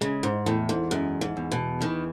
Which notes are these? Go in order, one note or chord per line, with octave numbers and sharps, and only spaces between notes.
C#3 G#3
G#2
E2 A2
G#2
F#2 G#3
G#2
E2
B2
D#3 E3